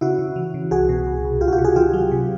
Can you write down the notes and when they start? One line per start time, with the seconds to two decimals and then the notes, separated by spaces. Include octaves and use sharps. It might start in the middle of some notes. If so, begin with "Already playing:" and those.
0.01 C#3 E4 F#4
0.19 C#3
0.36 E3
0.54 C#3
0.71 C2 F#4 G#4
0.89 B2
1.07 C2
1.25 C2
1.41 C#2 F4 G4
1.48 F#4
1.52 F4 G4
1.58 C3
1.65 F#4 G#4
1.76 D#3 F4 G4
1.93 F#3
2.11 C3